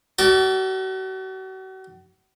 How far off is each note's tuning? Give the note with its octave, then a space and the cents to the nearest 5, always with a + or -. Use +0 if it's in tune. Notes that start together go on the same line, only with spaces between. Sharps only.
F#4 +40 A4 +30 D5 +0